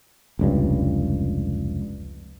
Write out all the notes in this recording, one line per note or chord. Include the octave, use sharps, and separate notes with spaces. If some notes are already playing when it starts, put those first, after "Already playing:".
F1 C#2 G2